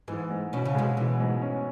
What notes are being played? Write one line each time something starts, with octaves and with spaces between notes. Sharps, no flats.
G#2 E3
G#2
B2 C#4
C#3
B2 G#3
B2 E3
G#2
C#4